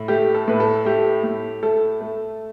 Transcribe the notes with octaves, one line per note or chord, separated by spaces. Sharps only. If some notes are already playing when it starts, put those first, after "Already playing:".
Already playing: A2
A3 G4
A4
A2 B4
A4
A3 G4
A2
A3 A4
A3